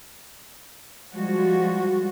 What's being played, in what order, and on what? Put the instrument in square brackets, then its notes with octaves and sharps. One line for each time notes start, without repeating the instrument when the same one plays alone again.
[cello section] F3 G3 G#3 F#4